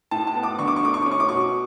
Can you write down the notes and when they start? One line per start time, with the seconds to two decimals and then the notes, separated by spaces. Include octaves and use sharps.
0.11 A2 A5
0.27 A5
0.35 B3
0.43 D6
0.59 D3 C#6
0.68 D6
0.76 C#6
0.83 A3 D6
0.94 C#6
1.02 C#4 D6
1.11 C#6
1.20 D6
1.29 B2 C#6